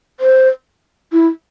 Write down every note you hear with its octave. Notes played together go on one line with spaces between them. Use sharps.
C5
E4